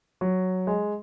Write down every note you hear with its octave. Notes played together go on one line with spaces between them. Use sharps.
F#3
G#3